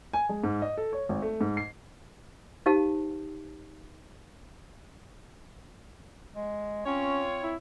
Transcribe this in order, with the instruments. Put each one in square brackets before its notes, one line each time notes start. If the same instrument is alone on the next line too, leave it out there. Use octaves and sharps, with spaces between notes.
[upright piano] G#5
G#3
G#2
D#5
A4
C#5
G#1
A3
G#2
C7
[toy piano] D#4 G4 C5 F5 A5
[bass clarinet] G#3
[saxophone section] C4 F4 C#5 [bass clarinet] C#4
[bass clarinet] E4